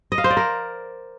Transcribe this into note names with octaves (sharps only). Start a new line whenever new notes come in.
D#5
F5
C5
D5
A#4